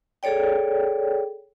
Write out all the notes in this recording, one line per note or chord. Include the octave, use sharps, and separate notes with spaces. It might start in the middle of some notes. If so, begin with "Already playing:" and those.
G#4 A4 C#5 D5 G5